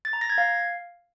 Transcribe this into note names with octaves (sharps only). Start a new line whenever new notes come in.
A6
A#5
A#6
G#6
F5